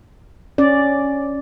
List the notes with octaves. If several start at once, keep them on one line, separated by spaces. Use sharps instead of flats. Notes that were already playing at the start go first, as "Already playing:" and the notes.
C#4 D5